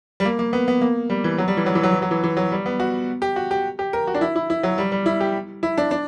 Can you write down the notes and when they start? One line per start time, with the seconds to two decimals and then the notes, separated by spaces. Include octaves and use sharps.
0.20 G3
0.25 A#3
0.39 A#3
0.53 B3
0.68 B3
0.81 A#3
1.10 G3
1.24 E3
1.38 F#3
1.48 G3
1.57 E3
1.66 F#3
1.75 E3
1.83 F#3
1.93 E3
2.02 F#3
2.11 E3
2.24 E3
2.37 F#3
2.52 G3
2.66 B3
2.80 F#4
3.22 G4
3.36 F#4
3.51 G4
3.79 G4
3.93 A#4
4.07 F#4
4.14 D4
4.21 E4
4.36 E4
4.50 E4
4.63 F#3
4.78 G3
4.92 G3
5.06 E4
5.20 G4
5.63 E4
5.78 D4
5.91 D4